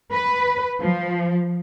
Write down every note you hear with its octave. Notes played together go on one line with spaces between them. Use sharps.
B4
F3